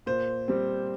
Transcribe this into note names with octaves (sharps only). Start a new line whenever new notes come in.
A#2 C5
G3 C4